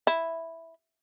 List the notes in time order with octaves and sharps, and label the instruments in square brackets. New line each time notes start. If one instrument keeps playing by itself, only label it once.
[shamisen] E4